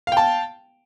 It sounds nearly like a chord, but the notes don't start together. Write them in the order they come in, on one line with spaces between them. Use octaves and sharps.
F5 G5 A5